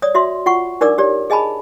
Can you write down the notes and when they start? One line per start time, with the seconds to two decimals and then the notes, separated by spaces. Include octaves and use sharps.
0.02 C#5 D5 D#6
0.15 F#4 E5 C6
0.46 F4 F#5 C#6
0.81 D4 D#4 A#4 D5 D6 E6
0.98 G4 C#5 D5
1.30 G#4 D#5 G#5 A5 B5